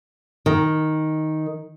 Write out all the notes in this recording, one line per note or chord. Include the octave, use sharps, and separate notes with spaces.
D#3